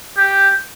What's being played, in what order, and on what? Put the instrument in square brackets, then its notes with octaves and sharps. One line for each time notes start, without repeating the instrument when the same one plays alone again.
[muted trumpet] G4